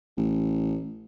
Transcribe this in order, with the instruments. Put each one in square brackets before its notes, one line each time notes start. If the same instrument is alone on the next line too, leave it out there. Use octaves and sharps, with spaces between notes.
[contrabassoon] A1